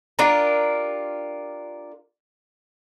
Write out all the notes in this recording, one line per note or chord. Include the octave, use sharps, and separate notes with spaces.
D4 F4 G4 A#4